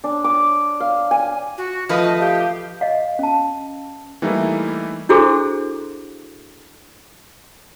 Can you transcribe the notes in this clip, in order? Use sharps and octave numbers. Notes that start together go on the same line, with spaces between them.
D4
D6
F5
G#5
F#4
F3 A3 B4 D#5
G4 F5
D#5 F5
C#4 A5
E3 G3 A3 A#3 D#4 E4
D4 E4 F#4 G#4 A4 C5